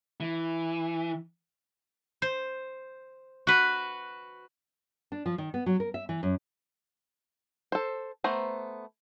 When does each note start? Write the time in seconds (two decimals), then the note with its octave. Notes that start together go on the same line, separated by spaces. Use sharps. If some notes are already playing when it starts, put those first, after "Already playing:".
0.20 E3
2.22 C5
3.47 F#4 B4
5.12 D4
5.26 F3
5.38 D#3
5.54 B3
5.66 F#3
5.80 A#4
5.94 E5
6.09 E3
6.23 F#2
7.72 A4 C5
8.24 A3 B3 C5 A#5